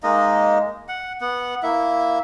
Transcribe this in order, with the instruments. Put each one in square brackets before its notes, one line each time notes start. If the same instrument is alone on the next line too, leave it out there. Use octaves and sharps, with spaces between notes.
[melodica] G#3 A#3 D#4 D#5
F#5
B3 F#5
A#3 E4 E5